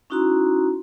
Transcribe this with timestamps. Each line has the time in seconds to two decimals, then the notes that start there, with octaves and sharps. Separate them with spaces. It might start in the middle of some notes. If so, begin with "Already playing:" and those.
0.10 C#4 D#4 E4 F#4 A#5 C6